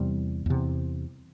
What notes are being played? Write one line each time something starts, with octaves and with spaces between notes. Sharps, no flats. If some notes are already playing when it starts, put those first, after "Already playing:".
Already playing: E2 C3 G3
E2 C3